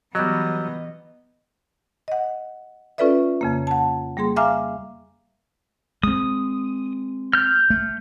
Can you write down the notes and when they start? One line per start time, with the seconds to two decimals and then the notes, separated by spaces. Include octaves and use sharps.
0.15 E3 F#3 G3 B3 D#5
2.08 D#5 F#5
2.98 C#4 F4 A4 B4 D5 E5
3.41 F2 C#3 A#3
3.67 F#5 A5
4.17 G3 A#3 G#4 C6
4.36 E5 F5 G#5 A#5 D6 F6
6.03 G#3 C4 D#6
7.33 F6 G6
7.70 A3